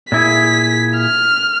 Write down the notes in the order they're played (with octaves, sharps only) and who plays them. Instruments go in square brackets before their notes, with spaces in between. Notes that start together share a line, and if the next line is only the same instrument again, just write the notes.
[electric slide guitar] A#2 E4 G#4 [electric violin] B6
[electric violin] F6